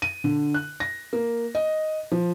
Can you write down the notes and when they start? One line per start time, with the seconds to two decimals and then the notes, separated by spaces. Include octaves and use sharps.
0.02 D#7
0.24 D3
0.54 F#6
0.80 A#6
1.13 A#3
1.55 D#5
2.11 F3